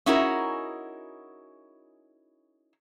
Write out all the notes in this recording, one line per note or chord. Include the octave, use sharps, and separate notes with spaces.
C#4 D#4 E4 F#4 G#4 A#4